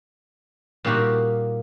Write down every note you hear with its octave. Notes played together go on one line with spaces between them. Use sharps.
A#2 G3 A#3 D#4 F#4 G4